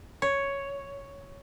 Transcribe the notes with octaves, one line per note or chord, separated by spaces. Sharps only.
C#5